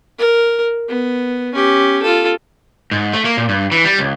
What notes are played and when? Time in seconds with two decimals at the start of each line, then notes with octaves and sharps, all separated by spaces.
0.19 A#4
0.89 B3
1.55 C#4 G4
2.03 F4 A4
2.91 G#2
3.13 A3
3.25 A#3
3.37 A#2
3.49 G2
3.72 E3
3.84 G3
3.99 C#2